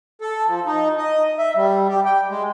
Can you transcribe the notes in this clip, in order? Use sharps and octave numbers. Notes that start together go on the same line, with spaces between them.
A4
F3
D#4
D#5
E5
G3
G4
G5
G#3